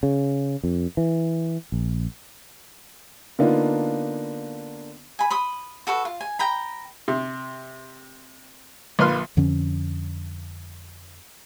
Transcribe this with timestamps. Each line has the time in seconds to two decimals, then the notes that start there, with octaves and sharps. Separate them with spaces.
0.03 C#3
0.64 F2
0.97 E3
1.72 A#1
3.39 D3 A#3 B3 D4 D#4 F4
5.19 G#5 B5
5.30 B5 C6 D#6
5.87 F#4 A4 B4
6.05 F4
6.21 G#5
6.39 G5 A#5 B5
7.08 C3
8.99 A#1 F4 B4 C6 F6
9.37 F2 D3 F3 C#4